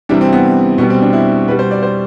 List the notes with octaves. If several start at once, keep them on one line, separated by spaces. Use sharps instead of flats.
C3 E3 G3 D4
C4
B3
B2 G3 B3
C4
D4
E4
B2 G3 B4
C5
D5
C5